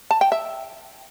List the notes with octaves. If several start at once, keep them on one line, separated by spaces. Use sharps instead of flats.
A5
G5
E5